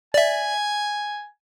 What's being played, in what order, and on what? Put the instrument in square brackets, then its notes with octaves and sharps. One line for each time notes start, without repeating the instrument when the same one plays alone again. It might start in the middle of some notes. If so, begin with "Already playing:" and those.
[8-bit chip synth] D5 E5 [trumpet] G#5